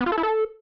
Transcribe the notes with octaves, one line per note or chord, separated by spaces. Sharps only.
B3
F4
A4
E4
A4